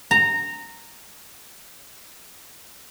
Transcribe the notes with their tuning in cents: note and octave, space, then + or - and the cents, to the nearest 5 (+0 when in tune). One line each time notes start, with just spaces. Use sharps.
A#5 -15